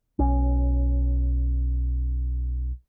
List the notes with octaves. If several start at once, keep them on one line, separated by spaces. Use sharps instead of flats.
B1 C#4